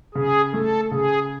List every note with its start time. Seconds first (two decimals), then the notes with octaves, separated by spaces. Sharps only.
0.15 C#3 G#4
0.53 A3 A4
0.91 C#3 G#4